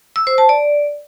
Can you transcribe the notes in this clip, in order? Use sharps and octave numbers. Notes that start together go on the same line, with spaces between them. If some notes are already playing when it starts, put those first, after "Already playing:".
E6
C5
A5
D5